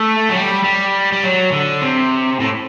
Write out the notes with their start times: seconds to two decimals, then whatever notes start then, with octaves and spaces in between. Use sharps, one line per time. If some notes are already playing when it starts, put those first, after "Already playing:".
Already playing: A3
0.29 F#3
0.35 G3
0.64 G3
1.12 G3
1.23 F#3
1.52 D3
1.82 C3
2.40 A2